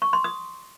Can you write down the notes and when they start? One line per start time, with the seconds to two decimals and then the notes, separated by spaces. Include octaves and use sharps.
0.02 C#6
0.13 C6
0.24 D#6